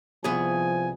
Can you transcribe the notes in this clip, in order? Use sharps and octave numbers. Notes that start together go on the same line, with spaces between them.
C2 F3 B3 G#4 G#5